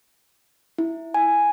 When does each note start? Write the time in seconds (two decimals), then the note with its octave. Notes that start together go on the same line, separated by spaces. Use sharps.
0.78 E4
1.14 G#5